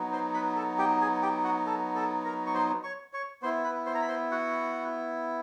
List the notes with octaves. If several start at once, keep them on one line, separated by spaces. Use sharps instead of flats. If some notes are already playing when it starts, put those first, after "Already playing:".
Already playing: F#3 B3 D#4
C5 C6
B4 B5
A4 A5
G4 G5
G#4 G#5
G4 G5
F#4 F#5
A4 A5
A4 A5
A#4 A#5
C#6
C5 C6
C#5 C#6
C#5 C#6
B3 E4 C5 C6
B4 B5
C5 C6
A#5
B5
C5 C6
F#4 F#5